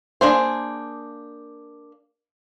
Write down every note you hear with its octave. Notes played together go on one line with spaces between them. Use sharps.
A#3 D4 G#4 C5